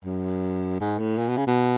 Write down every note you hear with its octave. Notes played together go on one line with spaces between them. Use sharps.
F#2
G#2
A2
A#2
B2
C#3
B2